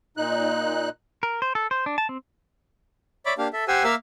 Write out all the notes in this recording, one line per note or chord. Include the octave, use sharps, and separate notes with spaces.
A#2 D#4 F#6
A#4
C5
A4
C5
D4
A5
C4
C#5 D5 E5 B5 D6
A#3 D4 G4 F5
A4 E5
G4 C5 F#5 G#5 E6
A#3 A#4 E5 F5 E6